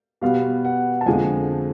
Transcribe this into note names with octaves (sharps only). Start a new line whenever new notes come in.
B2 G3 B3 F5
F#5
A5
F2 D3 F3 G#3 G#5